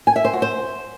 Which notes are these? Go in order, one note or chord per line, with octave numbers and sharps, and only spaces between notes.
G#5
E5
C5
F#4
C5